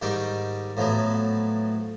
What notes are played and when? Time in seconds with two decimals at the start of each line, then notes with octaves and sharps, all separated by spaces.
0.02 G#2 D#3 G3 G4 C#6 D6
0.77 A2 F3 F#3 B3